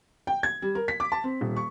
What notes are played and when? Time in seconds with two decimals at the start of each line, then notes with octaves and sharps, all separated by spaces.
0.27 G5
0.43 G#6
0.62 G3
0.75 A#4
0.88 B6
1.00 D6
1.12 A5
1.24 C4
1.41 D#1
1.56 C#6